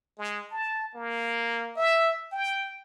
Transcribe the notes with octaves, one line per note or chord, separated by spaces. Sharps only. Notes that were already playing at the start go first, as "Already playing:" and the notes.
G#3
A5
A#3
E5
G5